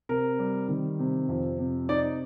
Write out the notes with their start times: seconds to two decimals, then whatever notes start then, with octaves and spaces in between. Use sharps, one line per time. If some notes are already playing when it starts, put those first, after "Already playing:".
0.09 C3 A#4
0.39 G3
0.69 D#3
1.00 C3
1.29 F2
1.59 C3
1.89 D#4 D5